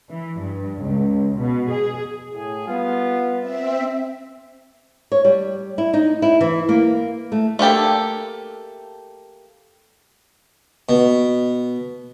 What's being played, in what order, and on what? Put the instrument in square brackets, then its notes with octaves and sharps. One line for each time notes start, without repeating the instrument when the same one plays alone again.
[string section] E3
G2
C#2
B2
G#4
[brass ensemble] A2 G#4
G3 B3 F4
[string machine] C4 E5
[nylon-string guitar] C#5
G3
E4
D#4
E4
E3
A#3
A3
[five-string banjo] A3 A#3 G4 A4
[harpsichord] B2